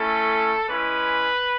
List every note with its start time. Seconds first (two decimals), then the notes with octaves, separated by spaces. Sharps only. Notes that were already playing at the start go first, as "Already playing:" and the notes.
Already playing: A3 C#4 E4 A4
0.68 G#3 C#4 E4 B4